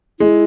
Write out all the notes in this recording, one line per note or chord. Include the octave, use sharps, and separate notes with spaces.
G#3 E4